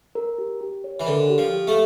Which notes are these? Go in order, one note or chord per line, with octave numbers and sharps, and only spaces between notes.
A#4
G4
G4
C#5
E3
D3 A#4
G4
F3
G4
A3